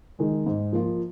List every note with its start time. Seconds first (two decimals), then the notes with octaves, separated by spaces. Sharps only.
0.19 D#3 G#3
0.46 G#2
0.73 F3 A#3 F4